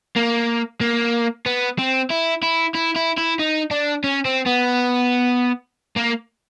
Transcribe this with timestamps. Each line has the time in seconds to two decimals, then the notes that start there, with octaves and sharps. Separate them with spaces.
0.16 A#3
0.81 A#3
1.46 B3
1.78 C4
2.10 E4
2.42 E4
2.75 E4
2.96 E4
3.17 E4
3.39 D#4
3.71 D4
4.04 C#4
4.25 C4
4.46 B3
5.96 A#3